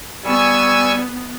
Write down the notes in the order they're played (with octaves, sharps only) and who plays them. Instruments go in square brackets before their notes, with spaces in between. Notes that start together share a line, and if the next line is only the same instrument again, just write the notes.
[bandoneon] G3 [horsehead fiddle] B3 [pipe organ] G#5 C#6 E6